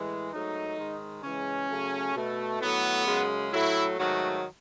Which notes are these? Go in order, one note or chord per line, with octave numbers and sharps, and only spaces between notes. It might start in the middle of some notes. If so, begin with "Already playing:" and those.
Already playing: A2 E3 G#3
G#2 F#3 A3 D#4
G#2 D#3 G#3
C#3 E3 G#3 C#4
C#3 F#3 A3
B2 A3
A2 F#3 A3 B3
F#2 C#3 G#3
A2 F#3 A3 E4
G#2 D#3 F#3 A3 F#4